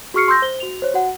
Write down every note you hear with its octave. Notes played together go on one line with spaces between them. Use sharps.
F#4 G#4 C#6 F6 C7 C#7
C6 E6 G6 A#6
C5 G7
F#4 F7
C5 C#5
F#4 F#5